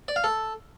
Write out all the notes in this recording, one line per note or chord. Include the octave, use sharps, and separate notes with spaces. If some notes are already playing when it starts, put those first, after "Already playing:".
D5
F5
A4